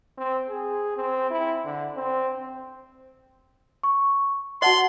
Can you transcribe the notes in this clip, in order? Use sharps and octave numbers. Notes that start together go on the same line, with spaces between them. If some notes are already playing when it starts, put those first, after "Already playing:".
C4
G#4
C4
E4
D3
C4
C#6
F#4 D#5 F#5 A5 C6 F#7